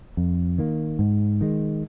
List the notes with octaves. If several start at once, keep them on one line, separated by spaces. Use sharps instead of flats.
F2
D#3 A#3
G#2
D#3 G#3